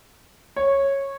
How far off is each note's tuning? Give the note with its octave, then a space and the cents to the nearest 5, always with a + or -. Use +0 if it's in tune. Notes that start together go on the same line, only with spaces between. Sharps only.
C#5 -10